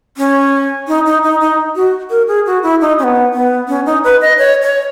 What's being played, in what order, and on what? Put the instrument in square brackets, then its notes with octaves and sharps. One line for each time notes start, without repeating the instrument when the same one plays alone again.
[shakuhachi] C#4
D#4
D#4
D#4
D#4
F#4
A#4
G#4
F#4
E4
D#4
C#4
B3
B3
C#4
D#4
B4
D#5
C#5
C#5